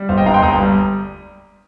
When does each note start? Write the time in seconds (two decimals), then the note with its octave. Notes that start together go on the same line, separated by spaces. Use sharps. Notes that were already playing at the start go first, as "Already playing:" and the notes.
Already playing: G3
0.09 G1 C5 F5
0.17 D#5 G5
0.26 G2 F5 A#5
0.34 G5 C6
0.42 G1 A#5 D#6
0.60 G3